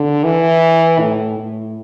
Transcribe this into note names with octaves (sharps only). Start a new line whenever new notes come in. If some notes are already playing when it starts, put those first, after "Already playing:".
Already playing: D3
E3
A2
A2